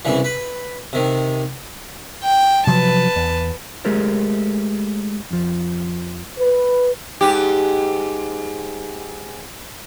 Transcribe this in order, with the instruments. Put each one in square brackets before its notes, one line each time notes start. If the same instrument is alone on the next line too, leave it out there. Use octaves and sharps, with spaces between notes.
[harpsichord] C2 C#3 E3
B4
C3 D#3
[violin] G5
[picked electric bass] C3 F3 F#3 [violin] B4 A5
[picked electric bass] E2
[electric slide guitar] G#3 A3 G4 G#4 A#4 C5
F2 F3
[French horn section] B4
[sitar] G#2 G4